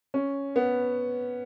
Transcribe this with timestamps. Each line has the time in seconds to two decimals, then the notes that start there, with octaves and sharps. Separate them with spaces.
0.14 C#4
0.56 B3